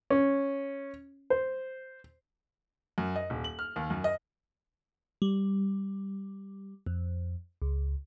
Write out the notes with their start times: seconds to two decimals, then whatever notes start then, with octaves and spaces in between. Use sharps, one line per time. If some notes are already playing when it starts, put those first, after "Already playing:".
0.10 C#4
1.30 C5
2.98 F#2
3.16 D#5
3.30 D#1
3.44 F#7
3.59 F6
3.76 D#2
3.90 F#2
4.04 D#5
5.22 G3
6.86 F2
7.62 C#2